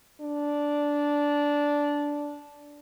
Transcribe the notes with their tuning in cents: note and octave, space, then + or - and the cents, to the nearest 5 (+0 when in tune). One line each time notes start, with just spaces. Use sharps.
D4 -10